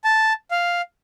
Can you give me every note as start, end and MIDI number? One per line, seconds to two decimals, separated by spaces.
0.04 0.33 81
0.51 0.81 77